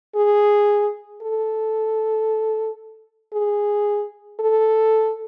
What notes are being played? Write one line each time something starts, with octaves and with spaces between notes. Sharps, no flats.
G#4
A4
G#4
A4